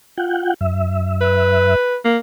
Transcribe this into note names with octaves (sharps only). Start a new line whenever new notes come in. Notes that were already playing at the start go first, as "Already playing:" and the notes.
F4 F#5 G5
F#2 E5
B4
A#3